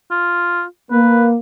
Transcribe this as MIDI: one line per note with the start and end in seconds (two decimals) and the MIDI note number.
0.11 0.63 65
0.91 1.37 58
0.91 1.27 71